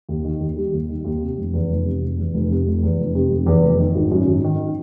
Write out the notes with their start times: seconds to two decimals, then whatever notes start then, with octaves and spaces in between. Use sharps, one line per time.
0.09 D#2
0.25 D#3
0.40 D#2
0.57 G3
0.73 D#2
0.89 D#3
1.05 D#2
1.22 C3
1.38 F1
1.54 E2
1.70 F1
1.85 C3
2.01 F1
2.18 E2
2.34 F1
2.50 C3
2.66 F1
2.83 E2
2.98 F1
3.15 C3
3.31 F1
3.46 E2
3.64 F1
3.79 D#3
3.96 G#1
4.11 F#2
4.27 G#1
4.44 D#3